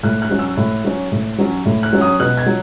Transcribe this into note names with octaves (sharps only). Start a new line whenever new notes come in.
A2 F#6
F#6
F#3 C#4
E6
A2
F#3 C#4
A2
F#3 C#4
A2
F#6
F#3 C#4
D#6
B2 F#6
G#6
F#3